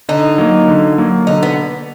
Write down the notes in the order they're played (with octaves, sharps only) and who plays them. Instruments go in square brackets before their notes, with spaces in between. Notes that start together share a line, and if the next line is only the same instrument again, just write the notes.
[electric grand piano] D3 [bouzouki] D#4
[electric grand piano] F#3 A#3
D3
F#3 A#3
[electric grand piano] D3 [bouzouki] D#4
[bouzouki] B3